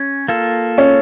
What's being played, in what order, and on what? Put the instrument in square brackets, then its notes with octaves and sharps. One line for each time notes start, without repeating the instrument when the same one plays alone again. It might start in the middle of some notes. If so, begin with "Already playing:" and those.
Already playing: [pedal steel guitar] C#4
A#3 F4 A4
[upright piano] C#4 C#5